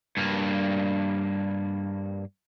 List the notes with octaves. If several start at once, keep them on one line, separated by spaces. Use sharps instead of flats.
G2 A#3